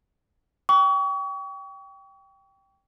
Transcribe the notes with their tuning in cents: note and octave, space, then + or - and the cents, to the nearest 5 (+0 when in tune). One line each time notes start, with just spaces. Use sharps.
G5 -5 C#6 +35